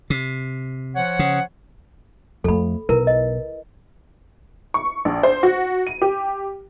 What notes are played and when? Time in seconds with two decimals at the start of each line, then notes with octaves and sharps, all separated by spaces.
0.10 C3
0.96 F3 C#5 F#5
1.19 C#3
2.44 F2 A3 A4 B5
2.89 B1 E4 A#4 B4
3.07 D#5
4.74 C#6
5.05 A#1
5.23 C5
5.43 F#4
5.87 D#7
6.02 G4